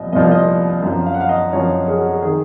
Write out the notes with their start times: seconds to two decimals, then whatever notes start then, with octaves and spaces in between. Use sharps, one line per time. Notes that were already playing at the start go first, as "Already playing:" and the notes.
Already playing: C2 A#2 F3 D#5
0.12 C2 A#2 F3 D#5
0.23 F5
0.31 D#5
0.82 F#2 F3
1.06 F5
1.14 F#5
1.21 F5
1.29 D#5
1.53 F#2 F3 C#5
1.88 G#4
1.97 F#4
2.08 G#4
2.22 D#3 G#4